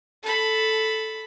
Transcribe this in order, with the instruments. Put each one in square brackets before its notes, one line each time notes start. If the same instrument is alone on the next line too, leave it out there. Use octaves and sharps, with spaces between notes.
[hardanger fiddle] A4 B5